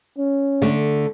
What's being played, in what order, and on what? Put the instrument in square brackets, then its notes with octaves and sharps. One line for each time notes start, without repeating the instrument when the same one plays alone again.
[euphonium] C#4
[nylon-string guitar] D3 A3